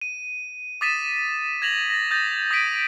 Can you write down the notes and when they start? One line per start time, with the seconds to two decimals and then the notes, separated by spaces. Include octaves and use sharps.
0.01 D#7
0.81 D6 D#6 A6 B6 D#7 E7
1.62 G#6 A#6 F7 F#7
1.90 A6 A#6
2.11 D#6 G6 A6 A#6
2.51 D#6 A6 B6 D7 D#7